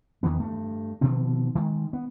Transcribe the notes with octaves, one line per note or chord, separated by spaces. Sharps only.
E2 D#3 E3 B3
G2 A3
B2 D#3 F3 C4
D#3 G#3
B3